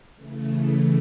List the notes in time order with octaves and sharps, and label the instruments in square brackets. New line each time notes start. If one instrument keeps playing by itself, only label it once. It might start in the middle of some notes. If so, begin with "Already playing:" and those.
[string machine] C#3 E3 A3